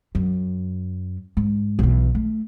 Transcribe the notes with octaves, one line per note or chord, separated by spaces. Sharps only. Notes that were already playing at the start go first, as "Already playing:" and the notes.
F#2
G#2
B1 E3
A3